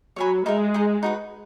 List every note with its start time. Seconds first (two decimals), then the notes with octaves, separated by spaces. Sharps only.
0.16 F#3 C#5 E5 G#5 B5
0.46 G#3 D#4 A#4 E5
0.74 D#4 G#4 D#5
1.03 D#4 F#4 B4